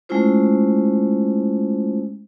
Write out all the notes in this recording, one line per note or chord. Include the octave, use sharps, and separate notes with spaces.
G#3 A3 C#4 E4 F4 C5